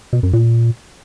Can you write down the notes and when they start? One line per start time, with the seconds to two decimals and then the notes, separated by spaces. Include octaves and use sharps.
0.13 B2
0.23 F#2
0.33 A#2